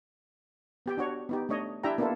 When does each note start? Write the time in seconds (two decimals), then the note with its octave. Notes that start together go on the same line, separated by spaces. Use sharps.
0.86 B3 G4 G5
0.97 D4 F#4 C#5
1.29 B3 D#4 G4
1.49 A3 D4 C#5 D#5
1.84 D4 E4 G4 E5 G5 A#5
1.98 A#3 B3 D4 E4 F4 A4